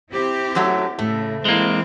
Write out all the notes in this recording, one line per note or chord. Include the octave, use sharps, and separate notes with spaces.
C4 E4 G4
F#2 F#3 A3
A2 C#3 A3
E3 G#3 A#3 C4 E4